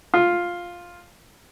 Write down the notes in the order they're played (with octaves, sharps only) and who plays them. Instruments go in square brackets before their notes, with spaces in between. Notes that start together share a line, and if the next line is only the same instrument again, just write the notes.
[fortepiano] F4